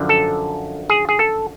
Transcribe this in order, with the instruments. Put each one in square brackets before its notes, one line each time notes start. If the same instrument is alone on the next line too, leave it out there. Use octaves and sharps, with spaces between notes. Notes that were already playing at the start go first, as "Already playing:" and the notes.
Already playing: [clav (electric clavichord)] F#2 D3 F3
A4
G#4
G#4
A4